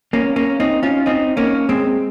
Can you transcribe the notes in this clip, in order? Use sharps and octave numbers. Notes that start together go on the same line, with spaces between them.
A#3 C#4
A#3 C#4
C4 D#4
C#4 F4
C4 D#4
A#3 C#4
G#3 C4